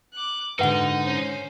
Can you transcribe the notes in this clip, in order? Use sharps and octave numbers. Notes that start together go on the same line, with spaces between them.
D6 F#6
G#2 D3 D#4 F#4 B4 F#5
C#4 C5